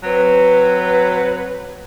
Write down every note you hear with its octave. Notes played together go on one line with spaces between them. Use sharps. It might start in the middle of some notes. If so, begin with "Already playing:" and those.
F#3 C4 B4